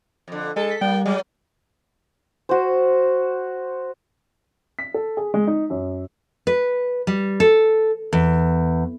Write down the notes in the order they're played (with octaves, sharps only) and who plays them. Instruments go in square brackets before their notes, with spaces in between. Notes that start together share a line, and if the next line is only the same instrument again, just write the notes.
[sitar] F2 D3
[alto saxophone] G#3 [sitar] A4
[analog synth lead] B6
[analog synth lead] G3 [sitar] A#3 [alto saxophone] G5
[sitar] F#3 [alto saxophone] G#3
[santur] F#4 C5
[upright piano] B6
A4
G#4
G#3
D#4
F#2
[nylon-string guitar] B4
G3
A4
E2